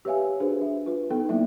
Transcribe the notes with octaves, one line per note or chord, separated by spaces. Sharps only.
G4 B4 C#5 E5 F5 G#5
D4 F#4 G#4 B4 C5
E5
F4 B4
B3 D#4 A4 G5
F#3 A#3 B3 E4 E5